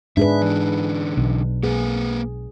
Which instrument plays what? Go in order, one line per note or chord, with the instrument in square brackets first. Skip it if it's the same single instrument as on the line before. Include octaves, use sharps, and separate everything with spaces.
[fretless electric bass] G#2 [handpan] D4 G#4 B4 [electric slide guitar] E5
[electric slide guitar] D3 E3
[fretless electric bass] B1
[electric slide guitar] A#3 B4 [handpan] G#4